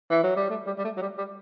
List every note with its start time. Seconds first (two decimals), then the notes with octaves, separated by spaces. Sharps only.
0.10 E3
0.23 F#3
0.36 G3
0.50 A3
0.66 G3
0.78 G3
0.84 A3
0.97 F#3
1.01 G3
1.18 G3